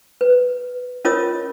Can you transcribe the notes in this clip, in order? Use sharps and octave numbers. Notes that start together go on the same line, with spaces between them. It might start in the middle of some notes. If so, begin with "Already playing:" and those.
B4
C#4 F4 A#4 C#5 D#5 D#6